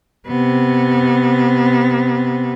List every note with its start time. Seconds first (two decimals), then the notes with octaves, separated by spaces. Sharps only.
0.27 C3 B3